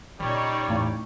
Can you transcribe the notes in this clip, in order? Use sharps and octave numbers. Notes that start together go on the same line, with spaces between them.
A#2 C#3 G3 D#4 C#5 D5
E2 A2